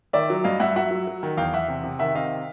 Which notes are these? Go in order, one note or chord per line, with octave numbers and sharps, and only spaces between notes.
D#3 D5 E5
F#3
G2 D#5 F5
G2 E5 F#5
F#3 E5 F#5
F#3
F#3
D#3
E2 F5 G5
E2 E5 F#5
C3
C3
D#3 E5 F#5
C3 D#5 F5